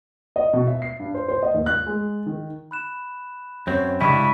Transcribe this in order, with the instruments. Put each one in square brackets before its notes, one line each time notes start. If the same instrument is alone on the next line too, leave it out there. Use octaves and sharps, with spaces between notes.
[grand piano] D#5
B2
E5
C7
G2
C5
C5
D#5
D#2
F#6
G#3
D#3
[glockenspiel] B5 F#6 E7
[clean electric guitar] F#2 C4 [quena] C#5
[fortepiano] C#2 G2 [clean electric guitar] E4 [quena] B5 [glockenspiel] C#6 B6 D#7